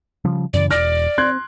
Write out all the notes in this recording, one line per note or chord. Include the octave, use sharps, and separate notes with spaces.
C#3 F3 G3
F#2 C#3 E3 D5
E1 D5 F6 A#6 D7
C4 C6 F#6 G#6